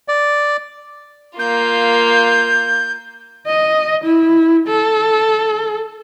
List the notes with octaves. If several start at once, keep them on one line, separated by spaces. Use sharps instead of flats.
D5
A#3 F4 G6
D#5
E4
A4